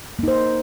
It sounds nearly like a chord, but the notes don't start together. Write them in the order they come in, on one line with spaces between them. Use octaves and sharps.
A#3 D#4 C5